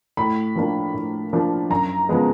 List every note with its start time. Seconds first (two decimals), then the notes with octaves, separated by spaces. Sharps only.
0.17 A2 B5
0.55 F3 A#3 D4
0.94 A2
1.33 F3 A#3 D4
1.70 F#2 A#5
2.09 C#3 F3 G#3 B3